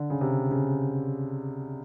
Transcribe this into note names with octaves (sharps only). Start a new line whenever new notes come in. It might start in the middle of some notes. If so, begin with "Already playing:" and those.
Already playing: D3
C#3
C3
C#3